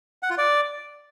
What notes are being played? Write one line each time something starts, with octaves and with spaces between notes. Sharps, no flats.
F#5
F4
D5